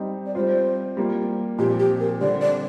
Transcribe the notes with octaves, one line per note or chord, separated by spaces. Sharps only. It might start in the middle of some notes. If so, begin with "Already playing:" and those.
Already playing: G3 C4 D#4
D5
G3 C4 F4 C5
G3 A#3 F4
A#2 F3 C4 F4 G4
G4
A#4
D3 G3 C4 D5
D5